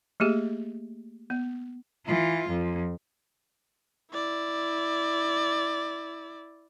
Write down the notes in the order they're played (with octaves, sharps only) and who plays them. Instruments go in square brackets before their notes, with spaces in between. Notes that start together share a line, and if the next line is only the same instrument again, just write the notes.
[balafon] A3 A#3 G4 G#4
B3
[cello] E3 F4
F2
[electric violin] E4 D5